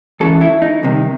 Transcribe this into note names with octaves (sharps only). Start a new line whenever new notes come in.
C#2 C#3 E3 A4
E4
D#4
C2 C3 D#3